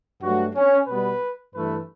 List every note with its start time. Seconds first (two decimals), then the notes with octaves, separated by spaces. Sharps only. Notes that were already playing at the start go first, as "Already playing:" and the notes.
0.22 G2 F#3 A3 F#4
0.55 C#4
0.88 B2 G3 B3 B4
1.54 G2 E3 A3 B4